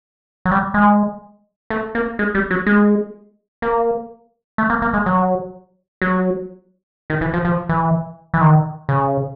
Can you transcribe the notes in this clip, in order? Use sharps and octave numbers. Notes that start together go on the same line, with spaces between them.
F#3
G3
G#3
A3
A#3
G#3
G3
F#3
G#3
A#3
A3
A#3
A#3
G#3
F#3
F#3
D#3
E3
F3
F3
E3
E3
D#3
C#3